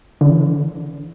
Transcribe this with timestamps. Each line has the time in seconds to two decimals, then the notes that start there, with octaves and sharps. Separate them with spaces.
0.21 D3
0.29 E3